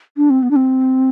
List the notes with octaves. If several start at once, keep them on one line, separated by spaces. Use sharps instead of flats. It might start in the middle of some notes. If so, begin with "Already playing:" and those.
D4
C4
B3
D4
C4